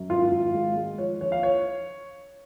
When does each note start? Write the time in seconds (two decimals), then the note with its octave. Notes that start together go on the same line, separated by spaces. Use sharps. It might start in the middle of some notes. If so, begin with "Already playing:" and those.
Already playing: F#2
0.10 G#1 F4
0.32 G#1
0.54 G#3
0.76 G#3
0.98 F3 C#5
1.21 A#1 C#5
1.32 F5
1.43 C#5